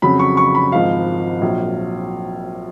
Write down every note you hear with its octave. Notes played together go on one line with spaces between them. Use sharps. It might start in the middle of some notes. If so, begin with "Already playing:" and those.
F2 C#3 F#3 B5
C#6
C#6
B5
G#1 G#2 F3 F5
A#1 A#2 F#3